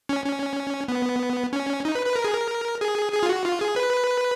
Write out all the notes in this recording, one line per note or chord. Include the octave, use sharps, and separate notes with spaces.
C#4
C#4
B3
C#4
D#4
B4
B4
A#4
G#4
A#4
G#4
G#4
F4
F#4
F4
G#4
B4